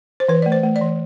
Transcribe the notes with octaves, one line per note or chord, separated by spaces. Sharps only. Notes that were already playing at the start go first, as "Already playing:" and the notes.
C5
E3 B4
A3 D5
C5
A3
D5
E3